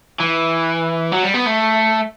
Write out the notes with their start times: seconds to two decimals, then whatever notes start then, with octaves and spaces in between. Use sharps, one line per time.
0.20 E3
1.12 F#3
1.24 G3
1.34 B3
1.46 A3